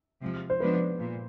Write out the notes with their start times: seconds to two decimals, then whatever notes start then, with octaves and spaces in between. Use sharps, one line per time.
0.22 C3 F3 G#3
0.50 C5
0.60 F3 G#3 B3 D4 B4
0.99 A#2